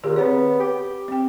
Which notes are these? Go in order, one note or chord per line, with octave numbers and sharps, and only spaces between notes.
A#2 D#3 G4 G#4
B3 C4 B4 C#5
G4
C4 G5